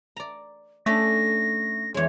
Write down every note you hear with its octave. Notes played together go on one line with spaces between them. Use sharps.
D5 A#5
A3 C#4 D4 A4 A#6
E2 G#3 C#5